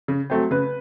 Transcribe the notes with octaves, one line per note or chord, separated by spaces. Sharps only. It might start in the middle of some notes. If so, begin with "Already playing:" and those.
C#3
F#3 A3 C4
C#3 B4